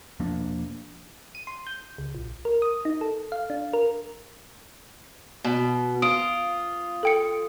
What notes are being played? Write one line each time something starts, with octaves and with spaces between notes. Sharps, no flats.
E1 F3 A#3 D4
D#7
C6
G6
C#2
A#1
A#4
D#6
D#4
A4
F5
D4
A#4
B2
F4 D#6 D7
A4 G5 C#7